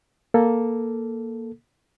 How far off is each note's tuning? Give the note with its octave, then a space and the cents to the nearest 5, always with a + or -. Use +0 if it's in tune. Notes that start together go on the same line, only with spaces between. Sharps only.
A#3 +0 A4 +0